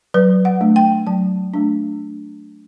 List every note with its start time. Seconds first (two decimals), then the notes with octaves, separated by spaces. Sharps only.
0.14 F#3 B4
0.45 F#5
0.61 A3 D4
0.76 G5
1.07 F#3 A5
1.54 A3 D4